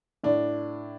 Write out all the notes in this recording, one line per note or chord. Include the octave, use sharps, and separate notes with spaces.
A2 D4